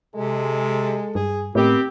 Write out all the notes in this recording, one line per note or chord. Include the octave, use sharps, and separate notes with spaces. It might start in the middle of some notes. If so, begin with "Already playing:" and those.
C3 G#3 A4
G2 G#4
A2 D#3 B3 C4 G4